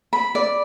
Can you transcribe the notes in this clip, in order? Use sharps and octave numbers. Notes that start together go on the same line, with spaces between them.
B5
D5